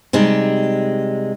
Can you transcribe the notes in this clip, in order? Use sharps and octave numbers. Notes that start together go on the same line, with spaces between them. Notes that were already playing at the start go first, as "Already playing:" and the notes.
C3 G3 G#3 D#4